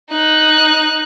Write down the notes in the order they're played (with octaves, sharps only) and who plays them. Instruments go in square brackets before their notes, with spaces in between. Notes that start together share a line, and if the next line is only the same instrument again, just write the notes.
[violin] D#4 F#6